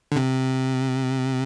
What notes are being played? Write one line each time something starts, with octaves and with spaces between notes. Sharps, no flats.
D3
C3